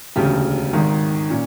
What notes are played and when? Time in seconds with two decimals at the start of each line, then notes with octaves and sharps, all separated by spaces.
0.16 E1 D2 C#3 G4
0.73 G#1 G#2 D#3
1.30 A#2 C#4